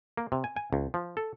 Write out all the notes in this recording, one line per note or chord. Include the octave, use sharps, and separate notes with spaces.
A#3
C3
G#5
G#5
C#2
F3
A4